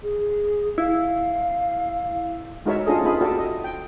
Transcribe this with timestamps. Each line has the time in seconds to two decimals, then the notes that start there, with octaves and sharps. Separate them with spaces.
0.03 G#4
0.78 E4 F5
2.66 G#3 D#4 F#4 A#4 C#5 E5
2.86 C#4 D4 F4 G#4 A4 D#5
3.04 A#3 D#4 F4 G#4 B5
3.21 F#4 G4 A4 D5 E5
3.38 D#5
3.64 G5